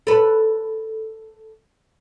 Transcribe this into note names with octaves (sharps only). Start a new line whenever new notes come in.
A4 B4